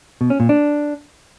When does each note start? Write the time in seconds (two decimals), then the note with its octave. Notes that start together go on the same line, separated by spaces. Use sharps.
0.21 B2
0.30 C#4
0.40 A#2
0.49 D4